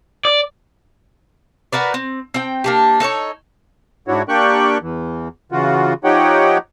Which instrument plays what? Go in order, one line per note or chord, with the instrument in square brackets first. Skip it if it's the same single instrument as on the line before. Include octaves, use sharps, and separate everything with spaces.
[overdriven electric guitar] D5
[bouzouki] F#4 A#4 B4 D5
C4
C4 G5
A#3 D4 G4
D#4 A4 B4 C#5
[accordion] G#2 D4 E4 F#4 C#5
A#3 D4 G4 G5 C#6 F#6
E2 E3
C#3 E3 F4 F#4
F3 D#4 G4 C#5 F#5 G5